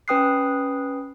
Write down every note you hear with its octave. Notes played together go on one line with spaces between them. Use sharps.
C#4 B4 G5 D#6 F#6 C7